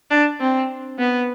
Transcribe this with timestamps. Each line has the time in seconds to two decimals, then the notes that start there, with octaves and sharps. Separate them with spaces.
0.10 D4
0.40 C4
0.99 B3